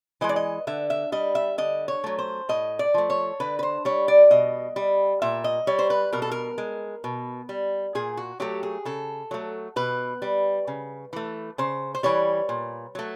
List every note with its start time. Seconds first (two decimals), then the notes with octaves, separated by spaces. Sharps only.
0.21 E3 G#3 D#5
0.29 D5
0.36 D#5
0.67 D3 E5
0.90 E5
1.12 G3 D#5
1.35 E5
1.58 D3 D#5
1.88 C#5
2.04 F#3 A3
2.18 C5
2.49 A2 D#5
2.79 D5
2.94 F3 A3
3.10 C#5
3.40 D3 B4
3.59 B4
3.63 C5
3.85 G3 C#5
4.08 D5
4.30 B2 D#5
4.76 G3
5.22 A#2 E5
5.44 D#5
5.67 G3 C#5
5.79 C5
5.90 B4
6.13 B2 A#4
6.22 A4
6.31 A#4
6.58 G#3
7.04 B2
7.49 G3
7.95 A#2 G#4
8.17 F#4
8.40 F#3 A3 G4
8.63 G#4
8.85 C#3 A4
9.31 F#3 A3
9.76 B2 B4
10.22 G3
10.67 C#3
11.13 E3 A3
11.58 C#3 C5
11.95 C5
12.03 E3 G3 C#5
12.49 A#2
12.95 F#3 A3